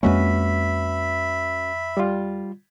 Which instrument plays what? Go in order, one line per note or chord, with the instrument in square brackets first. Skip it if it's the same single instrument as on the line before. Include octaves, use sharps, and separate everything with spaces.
[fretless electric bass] F2 G#3 A#3 [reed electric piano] C#4 F#4 B4 [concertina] E5 B5
[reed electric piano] G3 F4